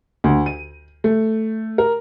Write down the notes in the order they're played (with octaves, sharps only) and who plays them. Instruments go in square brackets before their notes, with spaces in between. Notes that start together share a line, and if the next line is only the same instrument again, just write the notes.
[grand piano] D2
D#7
A3
A#4